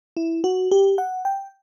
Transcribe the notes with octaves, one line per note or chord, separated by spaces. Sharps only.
E4
F#4
G4
F#5
G5